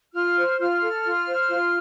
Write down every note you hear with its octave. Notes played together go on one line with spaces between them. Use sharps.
F4 F6
C5
F4 F6
A4
F4
C5
F4